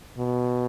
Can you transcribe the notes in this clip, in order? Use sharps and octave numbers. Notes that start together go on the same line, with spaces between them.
B2